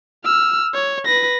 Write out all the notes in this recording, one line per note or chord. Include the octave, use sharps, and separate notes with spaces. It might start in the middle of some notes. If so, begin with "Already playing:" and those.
E6 F6
C#5
B4 A#6